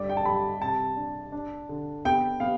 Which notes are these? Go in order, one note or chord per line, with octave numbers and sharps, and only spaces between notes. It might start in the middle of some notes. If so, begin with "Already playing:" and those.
Already playing: G2 D3 G3 D5
G5
A5
G3 B5
C3 A5
D4
D4
D3
B3 G5
B3 F5